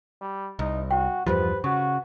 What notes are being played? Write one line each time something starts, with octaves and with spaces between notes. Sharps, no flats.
G3
C2 D#4
F#4 G5
E2 G2 F3 G4 B4 C5
C#3 F#4 C#6